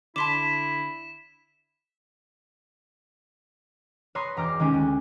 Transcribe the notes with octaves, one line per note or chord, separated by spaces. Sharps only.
D3 E4 A5 C6 D6 B6 E7
B4 C#5 A#5 C6 D#6
E1 A#5 D6 F6 G6
D#3 G#3 C#4 G4
D2